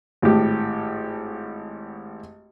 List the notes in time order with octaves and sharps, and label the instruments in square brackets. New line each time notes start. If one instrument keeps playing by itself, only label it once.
[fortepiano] G#1 A2 G4